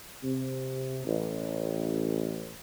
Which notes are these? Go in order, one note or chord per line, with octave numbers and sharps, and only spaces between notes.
C3
A1